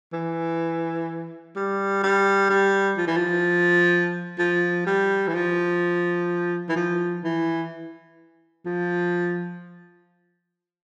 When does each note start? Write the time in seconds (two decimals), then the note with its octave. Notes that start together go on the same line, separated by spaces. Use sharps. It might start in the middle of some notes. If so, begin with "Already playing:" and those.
0.13 E3
1.56 G3
2.03 G3
2.50 G3
2.97 F3
3.07 E3
3.17 F3
4.39 F3
4.86 G3
5.28 E3
5.34 F3
6.69 E3
6.76 F3
7.24 E3
8.65 F3